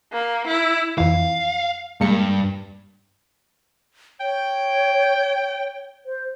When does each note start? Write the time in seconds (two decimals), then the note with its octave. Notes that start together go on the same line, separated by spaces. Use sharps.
0.12 A#3
0.47 E4
0.98 F2 E3 F5
2.01 G2 G#3 A#3 C#7
4.20 C#5 G5
6.06 C5